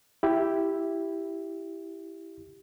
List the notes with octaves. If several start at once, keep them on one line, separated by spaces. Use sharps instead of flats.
E4 G4